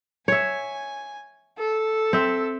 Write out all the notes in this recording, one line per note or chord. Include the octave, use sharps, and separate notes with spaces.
C#5 E5 G#5
A4
C4 E5